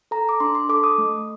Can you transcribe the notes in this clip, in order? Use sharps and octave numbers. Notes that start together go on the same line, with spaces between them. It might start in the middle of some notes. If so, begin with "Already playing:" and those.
A4 A#5
D6
D4 C6
C6
A4 D6
D#6
A3